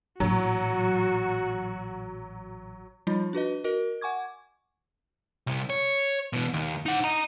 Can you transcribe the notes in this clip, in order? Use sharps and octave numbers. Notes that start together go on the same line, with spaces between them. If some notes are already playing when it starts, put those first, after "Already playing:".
A1 A#2 F#3 F#4
F3 G3 D#4 F4
D4 F#4 B4 D#5
F#4 A#4 D#5
F#5 G#5 C#6 D6 G#6
C2
C#5
B2 E3
D#2
D#4 F#5
D#5 A#5